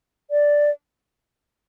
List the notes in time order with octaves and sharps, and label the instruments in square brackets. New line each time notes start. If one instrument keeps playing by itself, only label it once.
[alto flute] D5